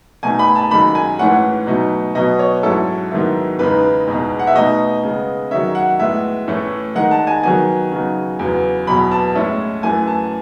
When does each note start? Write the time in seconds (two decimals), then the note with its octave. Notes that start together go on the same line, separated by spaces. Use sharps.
0.23 B2 A3 D#4 G#5
0.39 B5
0.55 A5
0.71 F#2 D#3 G#3 D#4 B5
0.95 G#5
1.19 G#2 E3 A3 C#4 F#5
1.67 B2 F#3 A3 D#4
2.15 B2 F#3 B3 D#5
2.39 C#5
2.63 G#2 F#3 C#4 E4 A4
3.11 G#2 D#3 F#3 B3 E4
3.59 E2 C#3 G#3 D#4 B4
4.07 E2 B2 G#3 D#4
4.39 F#5
4.47 E5
4.55 B2 A3 D#4 D#5
5.03 C#3 G#3 B3
5.51 D#3 F#3 C#4 E5
5.75 F#5
5.99 A2 G#3 B3 E5
6.47 A2 E3 A3 C#4
6.95 D#3 G#3 D#4 F#5
7.11 A5
7.27 G#5
7.43 D#3 F#3 B3 G#5
7.91 C#3 F#3 B3 D#4
8.39 E2 C#3 F#3 B3
8.87 E2 B2 F#3 B5
9.11 A5
9.35 A2 G#3 C#4 E4
9.83 F#2 E3 A3 G#5
10.07 A5